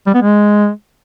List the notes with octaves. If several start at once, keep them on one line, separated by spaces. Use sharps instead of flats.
G3
B3
G#3